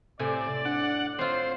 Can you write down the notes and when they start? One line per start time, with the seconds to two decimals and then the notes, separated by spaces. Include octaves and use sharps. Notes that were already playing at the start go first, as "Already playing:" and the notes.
0.19 A2 C3 A4 D5 G#5
0.65 D4 F#5
1.19 C4 F4 C5 C#5